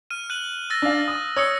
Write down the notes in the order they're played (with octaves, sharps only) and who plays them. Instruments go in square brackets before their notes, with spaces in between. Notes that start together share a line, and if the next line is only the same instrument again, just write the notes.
[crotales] F6 D#7
F#6 D#7 F#7
E6 A6 A#6
[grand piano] D4 F5
D#6
[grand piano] C#5 [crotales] D#6 E6 C#7